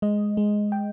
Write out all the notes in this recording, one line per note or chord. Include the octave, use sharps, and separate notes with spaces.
G#3 D#5
G#3
G5